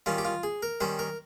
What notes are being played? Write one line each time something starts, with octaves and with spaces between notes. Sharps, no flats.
D#3 G3 C#4 F4
G4
F4
G#4
A#4
D#3 G3 C#4 C5
A#4